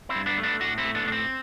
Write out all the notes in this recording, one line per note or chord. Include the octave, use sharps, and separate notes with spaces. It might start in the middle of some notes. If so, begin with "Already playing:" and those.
C4 E4
G2
B3 D4
A3
B3 D4
A2 D4 F#4
C4 E4
A3
B3 D4
A2 D4
C4